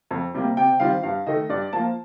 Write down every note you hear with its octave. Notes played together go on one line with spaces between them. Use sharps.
F2
C3 G3 A#3
C3 G5
D#3 G3 C4 F4 F5
G2 F5
D#3 A3 D#5
G2 D5
F3 A#3 F4 A5